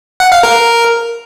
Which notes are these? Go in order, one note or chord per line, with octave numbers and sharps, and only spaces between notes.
F#5
F5
A#4